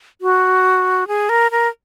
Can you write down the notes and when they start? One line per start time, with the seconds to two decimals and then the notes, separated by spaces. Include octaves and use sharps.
0.21 F#4
1.08 G#4
1.29 A#4
1.51 A#4